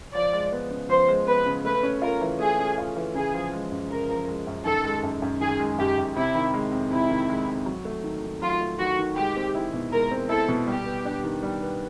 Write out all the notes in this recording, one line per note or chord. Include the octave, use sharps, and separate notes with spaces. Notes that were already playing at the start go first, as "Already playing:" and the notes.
F3 D5
G#3
B3
C#3
F3 C5
G#3
B3 B4
C#3
A3 B4
C#4
F4 A#4
E3
A3 G#4
C#4
F4
E3
C#3 G#4
F3
G#3
F#2
C#3 A#4
F3
G#3
F#2
D#3 A4
G#3
F#2
F#2
D#3 G#4
G#3
F#2 G4
F#2
C3 E4
D#3
G#3
F2
C3 E4
D#3
G#3
F2
F#3
A3
D#3
D#3
F#3 F4
A3
D#3 F#4
D#3
G#3 G4
C4
E4
B2
G#3 A#4
C4
E4 A4
B2
G3 G4
B3
D4
D#3
G3
B3